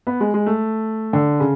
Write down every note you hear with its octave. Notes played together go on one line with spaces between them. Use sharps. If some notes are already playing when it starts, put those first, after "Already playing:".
B3
G#3
G#3
A3
D3
C#3